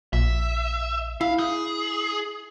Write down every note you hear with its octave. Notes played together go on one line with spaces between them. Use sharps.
A#1 E5
E4 F5
G#4